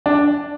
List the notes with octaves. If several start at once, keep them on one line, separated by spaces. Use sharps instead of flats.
D4